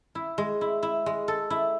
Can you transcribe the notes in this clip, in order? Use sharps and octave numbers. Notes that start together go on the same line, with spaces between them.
E4
G#3
E4
E4
G#3
A4
E4